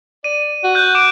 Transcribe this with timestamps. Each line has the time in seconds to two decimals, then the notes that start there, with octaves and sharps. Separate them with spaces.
0.24 D5 D#7
0.64 F#4
0.75 F#6 G6
0.95 D6 D7